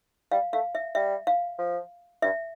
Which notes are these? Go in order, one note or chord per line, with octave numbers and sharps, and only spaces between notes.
G3 F5
A3 F5
E5
G3 E5
F5
F3
G2 E5